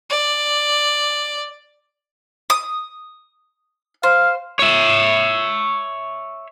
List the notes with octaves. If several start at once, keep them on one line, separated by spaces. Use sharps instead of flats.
D5
D#6
C5 F5
C#5 E5